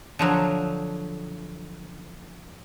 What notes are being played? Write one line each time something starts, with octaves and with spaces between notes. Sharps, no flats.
D3 F3 F#3